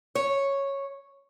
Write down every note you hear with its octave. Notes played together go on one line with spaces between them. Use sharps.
C#5